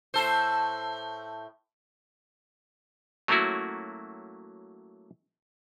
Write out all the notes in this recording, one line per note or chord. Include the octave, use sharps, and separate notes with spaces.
A2 A4 C5
F#3 A3 A#3 C#4 E4 F#4